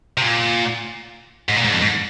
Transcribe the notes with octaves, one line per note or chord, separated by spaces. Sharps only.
C3
A#2
G#2
A#2
G#2
F2
G#2